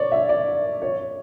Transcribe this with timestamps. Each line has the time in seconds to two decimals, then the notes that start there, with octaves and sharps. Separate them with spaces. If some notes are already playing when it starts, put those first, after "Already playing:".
Already playing: C#5 D5
0.12 E5
0.29 D5
0.82 C#5